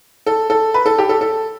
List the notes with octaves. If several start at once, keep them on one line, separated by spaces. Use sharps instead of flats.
A4
A4
B4
A4
G4
A4
A4